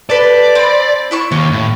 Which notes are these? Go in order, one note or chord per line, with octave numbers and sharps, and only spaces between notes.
A4 B4 D5
C4 B5
E4 E5 C#6
D#2 C#4
A2